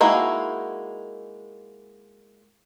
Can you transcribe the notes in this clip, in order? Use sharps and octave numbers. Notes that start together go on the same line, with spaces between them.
G#3 A#3 D#4 E4 F#4